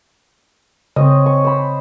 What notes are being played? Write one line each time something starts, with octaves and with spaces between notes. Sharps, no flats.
C#3 C4 C#5 D#5
C#6
C5 B5